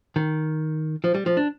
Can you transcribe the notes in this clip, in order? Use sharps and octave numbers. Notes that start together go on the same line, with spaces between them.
D#3
F3
G3
F3
D4